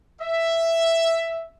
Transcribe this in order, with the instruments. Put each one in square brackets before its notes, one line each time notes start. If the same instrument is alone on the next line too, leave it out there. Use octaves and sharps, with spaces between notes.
[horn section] E5